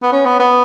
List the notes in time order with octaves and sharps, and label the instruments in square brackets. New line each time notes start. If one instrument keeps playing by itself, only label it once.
[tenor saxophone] B3
C#4
B3
B3